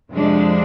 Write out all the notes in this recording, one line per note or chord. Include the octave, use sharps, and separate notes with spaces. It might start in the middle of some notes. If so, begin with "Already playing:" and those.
F2 C3 F3 G#3 D4